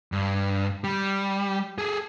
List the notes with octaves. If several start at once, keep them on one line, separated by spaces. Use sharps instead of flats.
G2
G3
G#4 A4